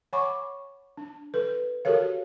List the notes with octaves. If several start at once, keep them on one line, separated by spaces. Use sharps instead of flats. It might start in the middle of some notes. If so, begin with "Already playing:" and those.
C#5 F#5 G#5 B5 C#6 D6
D4
A4 B4
F#4 G4 A4 A#4 C#5 F5